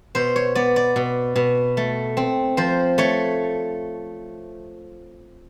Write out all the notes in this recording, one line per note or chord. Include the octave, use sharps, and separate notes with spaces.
B2 C5
C#5
B3 D5
D5
B2
B2
A3
C4
F3 C5
A3 C#5